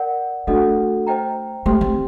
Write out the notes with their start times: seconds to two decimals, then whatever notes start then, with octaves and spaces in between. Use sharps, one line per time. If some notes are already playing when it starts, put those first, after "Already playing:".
Already playing: A#4 D5 F#5
0.47 A3 D4 F#4 A4 D#5 F#5
1.07 C5 D#5 G5 A#5
1.66 A3 G4 C5 G5 C6
1.81 C4